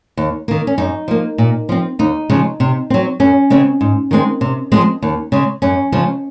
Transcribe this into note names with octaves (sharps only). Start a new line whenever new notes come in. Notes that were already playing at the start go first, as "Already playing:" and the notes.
D#2
D#3 A#3
C#4
F#2 D#4
F3 A#3
A#2
F3 C4
D#2 D#4
C#3 F3 G#3
C3
F#3 C4
F#2 C#4
C#3 G#3 C4
G#2
D#3 G#3 C4
C3
F3 G#3 C4
D#2
C#3 G#3
F#2 C#4
C#3 F3 G#3